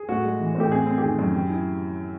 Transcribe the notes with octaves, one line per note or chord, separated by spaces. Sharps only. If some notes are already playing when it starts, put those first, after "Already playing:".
Already playing: G#4
A2 F#4
G#3
E3
A2
G4
C4 G#4
C4
G4
D#3 G#4
F#2
G4
E4